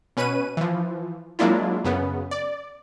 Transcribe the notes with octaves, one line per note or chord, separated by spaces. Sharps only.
B2 C#4 B4 D#7
E3 F3
F#3 G#3 A#3 D4 E4 F4
F#2 C#3 B3
D5